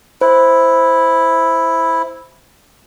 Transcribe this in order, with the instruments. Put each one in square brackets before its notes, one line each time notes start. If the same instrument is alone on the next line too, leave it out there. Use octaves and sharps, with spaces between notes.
[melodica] E4 [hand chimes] C5